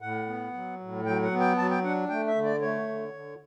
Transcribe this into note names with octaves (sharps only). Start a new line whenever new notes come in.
A2 F#5
B3
F#3
A2
F#3 G5
F#5
B3
G5
F#3 A5
G5
D4 F#5
A3 G5
E5
D3
D5
A3 C#5
D3
D3